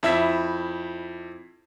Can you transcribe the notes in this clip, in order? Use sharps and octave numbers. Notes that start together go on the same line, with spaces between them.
F2 E4 E5 E6 B6